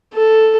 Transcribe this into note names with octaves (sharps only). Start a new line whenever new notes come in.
A4